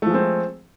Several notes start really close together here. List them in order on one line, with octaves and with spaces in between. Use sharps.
A3 F3 G#3 C4